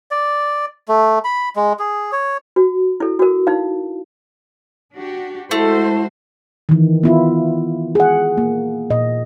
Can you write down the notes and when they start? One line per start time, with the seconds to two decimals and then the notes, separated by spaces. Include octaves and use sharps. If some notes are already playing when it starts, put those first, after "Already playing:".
0.11 D5
0.88 A3
1.24 B5
1.56 G#3
1.79 G#4
2.12 C#5
2.56 F#4
3.00 E4 A4
3.19 F#4 A#4
3.47 D#4 E4 F5
4.94 D4 F#4 G4
5.51 G#3 A3 E4 F#4 C5
6.69 D#3 E3
7.03 B3 E4 F4
7.95 G#4 F#5
8.38 A#3
8.90 A#2 D#5